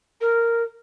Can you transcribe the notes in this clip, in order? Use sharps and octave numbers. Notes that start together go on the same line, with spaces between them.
A#4